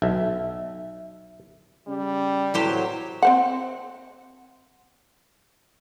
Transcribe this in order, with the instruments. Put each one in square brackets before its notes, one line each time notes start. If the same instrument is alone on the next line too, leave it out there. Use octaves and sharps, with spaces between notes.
[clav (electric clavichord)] B1 [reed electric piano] E5
[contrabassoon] C#3 [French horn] G3
[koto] A2 G4 C5 [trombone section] C3 F#3 [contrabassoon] E3
[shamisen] C4 C5 F#5